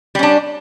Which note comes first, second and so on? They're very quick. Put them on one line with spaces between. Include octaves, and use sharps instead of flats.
G3 C#4 D4